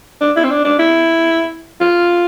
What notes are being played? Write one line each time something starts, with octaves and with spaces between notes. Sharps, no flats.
D4
E4
C4
D4
D4
E4
F4